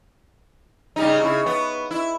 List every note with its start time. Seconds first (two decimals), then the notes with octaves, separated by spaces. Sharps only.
0.96 C#3 G3 D#4
1.21 C#3 E4
1.46 B3
1.91 E4